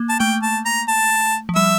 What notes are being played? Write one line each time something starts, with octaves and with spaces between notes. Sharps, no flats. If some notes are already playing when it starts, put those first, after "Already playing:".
Already playing: A#3
A5
A3 G5
A5
A#5
A5
F3
G3 E5